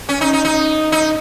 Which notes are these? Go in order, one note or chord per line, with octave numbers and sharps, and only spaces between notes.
C#4
D#4
D#4
D#4
D#4